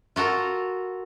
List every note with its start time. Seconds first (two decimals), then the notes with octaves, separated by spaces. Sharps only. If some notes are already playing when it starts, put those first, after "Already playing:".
0.16 F4 F#4 A4 A#4